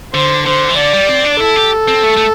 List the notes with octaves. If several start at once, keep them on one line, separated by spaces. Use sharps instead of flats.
D3 C5
D3 C5
E3
D3 D5
G3
C4
D4
E4 A4
G4
C4
A3
A3